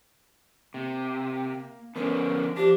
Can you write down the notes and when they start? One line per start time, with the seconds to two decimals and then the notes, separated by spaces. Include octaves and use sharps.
0.74 C3 A#3
1.96 D3 F3 B3 C#4 A#4
2.57 F3 D4 G4